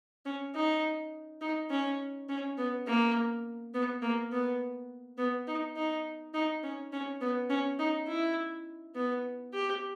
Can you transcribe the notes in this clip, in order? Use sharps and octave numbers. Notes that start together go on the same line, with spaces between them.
C#4
D#4
D#4
C#4
C#4
B3
A#3
B3
A#3
B3
B3
D#4
D#4
D#4
C#4
C#4
B3
C#4
D#4
E4
B3
G4